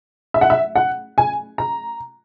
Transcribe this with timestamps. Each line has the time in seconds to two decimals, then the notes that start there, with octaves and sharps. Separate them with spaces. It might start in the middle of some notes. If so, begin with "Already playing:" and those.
0.34 E5
0.41 F#5
0.50 E5
0.76 F#5
1.18 G#5
1.58 A#5